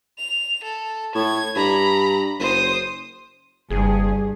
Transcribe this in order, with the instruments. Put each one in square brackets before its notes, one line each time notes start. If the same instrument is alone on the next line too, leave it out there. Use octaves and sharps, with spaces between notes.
[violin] F7
A4
[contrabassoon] A2 [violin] G#6
[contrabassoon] G2 [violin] A#5 B5
[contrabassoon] F#1 [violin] C5 D#6
[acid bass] F#1 [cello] G2 [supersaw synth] G#4